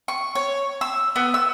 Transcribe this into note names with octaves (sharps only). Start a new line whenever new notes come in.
C#6
C#5
E6
B3
E6